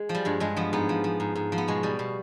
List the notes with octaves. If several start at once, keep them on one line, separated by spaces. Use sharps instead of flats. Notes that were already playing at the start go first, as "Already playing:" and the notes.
Already playing: G#3
F3
G3
G2 G#3
G2 G#3
F3 B3
G#2 B3
F3
F3
G#2
G#2
F3
B3
B2 G#3
B2 G3
B2